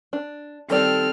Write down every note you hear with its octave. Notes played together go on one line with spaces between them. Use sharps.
D4
D#3 G3 C4 A4 D5 F6